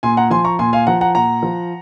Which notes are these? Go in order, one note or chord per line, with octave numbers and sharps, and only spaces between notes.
A#2 G#5 C6
F#5 A#5
F3 G#5 C6
A#5 C#6
A#2 G#5 C6
F5 G#5
F3 F#5 A#5
F#5 A#5
A#2 F#5 A#5
F3